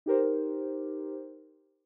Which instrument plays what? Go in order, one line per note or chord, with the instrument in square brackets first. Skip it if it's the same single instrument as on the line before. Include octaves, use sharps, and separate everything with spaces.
[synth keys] D#4 G4 A#4 C5